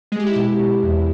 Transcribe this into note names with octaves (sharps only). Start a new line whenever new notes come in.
G#3 G#4
G4
E4
B2 G4
B2
E2